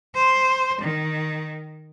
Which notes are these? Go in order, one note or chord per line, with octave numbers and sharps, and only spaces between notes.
C5
D#3